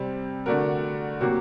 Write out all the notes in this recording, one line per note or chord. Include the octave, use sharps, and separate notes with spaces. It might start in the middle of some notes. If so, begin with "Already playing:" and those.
Already playing: C3 G3 C4
D3 A3 D4 F#4 A#4
C3 F#3 A#3 F#4